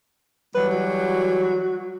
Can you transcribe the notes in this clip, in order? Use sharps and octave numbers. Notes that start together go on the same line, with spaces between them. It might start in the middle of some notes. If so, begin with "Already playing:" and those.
E3 F#3 G3 B4
F#4